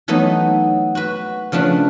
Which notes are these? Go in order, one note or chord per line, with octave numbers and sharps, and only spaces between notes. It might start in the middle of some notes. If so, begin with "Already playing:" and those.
E3 F#3 A3 B3 D#4
F#4 B4
C#3 F3 A3 D4 B4